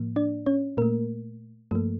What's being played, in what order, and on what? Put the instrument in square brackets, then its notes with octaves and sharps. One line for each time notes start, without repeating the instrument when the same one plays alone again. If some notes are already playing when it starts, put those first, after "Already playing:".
Already playing: [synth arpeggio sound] A2 F3 A#3
D4 D5
C#4 C#5
A#2 A3 A#3 A#4
G2 F3 A3 A#3 A4